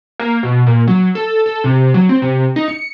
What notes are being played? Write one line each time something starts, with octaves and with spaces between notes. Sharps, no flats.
A#3
B2
A#2
F#3
A4
A4
C3
F#3
C4
C3
D#4
C#7